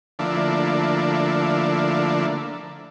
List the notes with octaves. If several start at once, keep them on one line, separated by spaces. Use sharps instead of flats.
D3 F3 A3 A#3 D4 E4